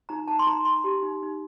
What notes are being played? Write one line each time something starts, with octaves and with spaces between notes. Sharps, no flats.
D#4 A#5
D#4 A5
C6
D#4 A#5
D#4 C6
G4
D#4
D#4